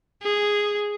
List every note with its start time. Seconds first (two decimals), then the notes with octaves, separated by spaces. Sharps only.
0.23 G#4